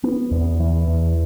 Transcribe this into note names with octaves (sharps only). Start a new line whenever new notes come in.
B3
E2
E3
E2